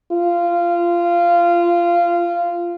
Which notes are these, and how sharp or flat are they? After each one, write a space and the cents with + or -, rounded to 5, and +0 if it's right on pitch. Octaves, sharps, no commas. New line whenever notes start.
F4 -15